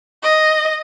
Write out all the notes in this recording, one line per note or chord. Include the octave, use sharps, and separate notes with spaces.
D#5